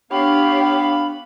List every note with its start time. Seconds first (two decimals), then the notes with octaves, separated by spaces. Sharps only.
0.11 B3 D4 G4 C#5 F5 B5